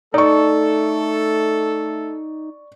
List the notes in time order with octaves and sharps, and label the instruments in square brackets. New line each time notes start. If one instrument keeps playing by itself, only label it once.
[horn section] A3 A4 [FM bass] D#4 [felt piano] D5 C#6